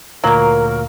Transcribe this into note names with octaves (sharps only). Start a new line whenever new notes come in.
D2 A#2 F#3 A#3 A#4 F5